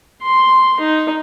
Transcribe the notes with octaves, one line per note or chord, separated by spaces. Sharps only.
C6
D#4